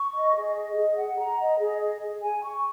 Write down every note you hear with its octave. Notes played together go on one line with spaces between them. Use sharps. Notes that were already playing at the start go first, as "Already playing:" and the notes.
Already playing: C#6
D#5
G#4
D#5
G#4
F#5
A#5
D#5
G#4
D#5
G#4
G#5
C#6